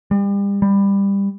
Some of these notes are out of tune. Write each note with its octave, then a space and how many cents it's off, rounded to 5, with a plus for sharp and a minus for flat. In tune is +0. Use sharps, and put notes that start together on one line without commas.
G3 +35
G3 +15